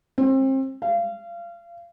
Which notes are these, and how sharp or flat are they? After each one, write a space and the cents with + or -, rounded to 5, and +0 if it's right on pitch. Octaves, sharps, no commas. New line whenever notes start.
C4 +30
F5 -30